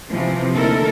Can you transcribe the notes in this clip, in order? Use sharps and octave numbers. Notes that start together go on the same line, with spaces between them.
C3 E3 F3
D#2 D3 A3 E4 A4 A#4